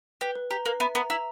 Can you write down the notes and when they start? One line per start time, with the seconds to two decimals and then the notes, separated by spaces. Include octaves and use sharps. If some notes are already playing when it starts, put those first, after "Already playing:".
0.21 G4 B4
0.35 B4
0.51 G4 A#5
0.65 A#3 B4
0.80 B3 E5
0.95 B3 A#5
1.10 E4 A#5